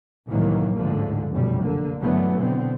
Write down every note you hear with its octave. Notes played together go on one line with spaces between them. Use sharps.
C2 A2 D#3 E3 F#3 A#3
A1 D2 G#2 D3 F3
F1 B1 F#2 B2 G3
D3 A#3
G2 D3 E3 F#3 A3 B3
B2 D3 B3 C4